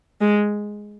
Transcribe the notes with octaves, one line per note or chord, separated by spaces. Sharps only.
G#3